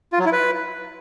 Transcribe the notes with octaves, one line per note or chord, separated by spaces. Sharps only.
F4
F#3
E4
B4